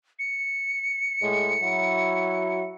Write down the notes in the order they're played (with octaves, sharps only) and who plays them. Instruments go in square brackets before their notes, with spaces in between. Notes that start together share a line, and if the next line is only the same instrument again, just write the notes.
[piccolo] C#7
[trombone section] A2 G#3
F#3 E4 F#4